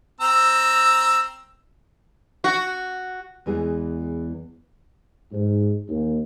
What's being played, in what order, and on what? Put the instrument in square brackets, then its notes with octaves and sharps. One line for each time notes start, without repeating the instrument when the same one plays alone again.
[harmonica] C4 A#5 E6
[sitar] F#4
[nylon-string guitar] E2 E3 G#3 B3 G#4
[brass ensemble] G#2
D#2